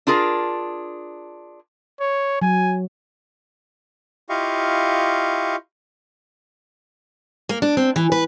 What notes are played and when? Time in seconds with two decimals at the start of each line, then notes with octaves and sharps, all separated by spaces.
0.07 D4 F4 G#4 A#4
2.01 C#5
2.42 F#3 G#5
4.29 E4 F4 G4 D#5 F5 C#6
7.49 A#3
7.62 D4
7.77 C4
7.96 E3
8.12 B4